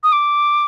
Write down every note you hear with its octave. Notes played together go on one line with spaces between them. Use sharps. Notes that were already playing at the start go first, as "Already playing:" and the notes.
D#6
D6